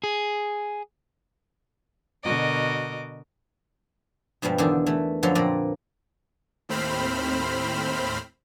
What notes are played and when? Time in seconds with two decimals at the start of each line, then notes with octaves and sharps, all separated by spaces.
0.04 G#4
2.23 B2 D3 F#4 A#4 D#5 D6
4.42 G2 B2 F3 G3 G#3
4.58 E2 D3 D#3 D4 G#4 A5
4.86 E3 A3
5.23 F#2 D3 F3 B4 C#5
5.35 F2 A#2 A#4 B4 D5 A#5
6.69 D#2 A2 C4 C5 B5 F6